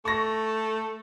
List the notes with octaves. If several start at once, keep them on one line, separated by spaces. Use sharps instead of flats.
A3 C#6 A#6